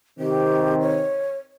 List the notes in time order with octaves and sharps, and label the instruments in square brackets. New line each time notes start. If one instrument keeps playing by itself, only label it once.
[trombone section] C3 D#3 C4 [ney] G4
[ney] C#5